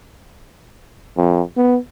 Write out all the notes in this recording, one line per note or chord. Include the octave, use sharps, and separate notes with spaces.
F2
B3